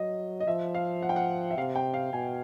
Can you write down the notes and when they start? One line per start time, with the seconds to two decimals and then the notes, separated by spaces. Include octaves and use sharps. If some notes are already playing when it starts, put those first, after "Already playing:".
Already playing: F#3 D#5
0.40 D#5
0.47 F3 E5
0.75 F5
1.02 F#5
1.09 G5
1.16 F#5
1.51 E5
1.57 C3 F5
1.76 G5
1.94 F5
2.13 B2 G#5